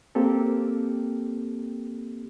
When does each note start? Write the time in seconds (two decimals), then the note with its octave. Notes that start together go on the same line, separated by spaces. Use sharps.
0.15 A#3 C4 G4 A4